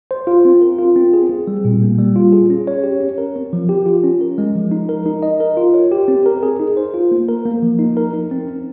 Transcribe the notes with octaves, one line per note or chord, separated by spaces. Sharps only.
C5
F4
C4
A#4
F4
C4
G#4
C4
G3
A#2
A#3
G3
F4
G#4
C#4
C#5
G4
C#4
A#4
C4
F3
G4
F4
C#4
A#4
G#3
F3
D#4
A#4
D#4
D#5
A#4
F4
C#5
G4
C4
A#4
G#4
D#4
C5
F4
A#3
A#4
A#3
F3
D#4
A#4
D#4
C4
C#4